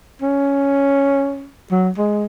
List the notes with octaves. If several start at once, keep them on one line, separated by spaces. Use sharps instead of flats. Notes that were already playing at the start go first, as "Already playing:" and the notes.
C#4
F#3
G#3